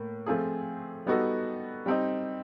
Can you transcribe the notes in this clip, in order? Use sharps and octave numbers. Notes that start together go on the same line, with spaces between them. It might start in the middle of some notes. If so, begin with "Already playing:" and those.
Already playing: A2 A#3
F3 A3 C4 F4 G#4
G3 B3 D#4 F#4 A4
G3 C4 D#4